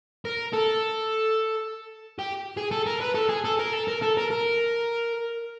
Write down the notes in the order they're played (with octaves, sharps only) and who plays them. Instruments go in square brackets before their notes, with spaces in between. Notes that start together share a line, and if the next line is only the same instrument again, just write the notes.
[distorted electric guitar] A#4
A4
G4
G#4
A4
A#4
B4
A4
G#4
A4
A#4
A4
A#4
A4
A#4
A#4